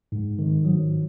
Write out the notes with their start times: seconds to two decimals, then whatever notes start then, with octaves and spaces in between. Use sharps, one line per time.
0.12 G#2
0.39 D#3
0.65 F#3